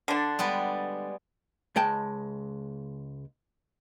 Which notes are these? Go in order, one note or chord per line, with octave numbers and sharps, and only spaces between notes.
D3 D4
G3 G#3 B3
C#2 G#3 G5 A5